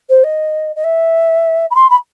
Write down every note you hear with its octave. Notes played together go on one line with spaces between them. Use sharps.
C5
D#5
D#5
E5
B5
C6
B5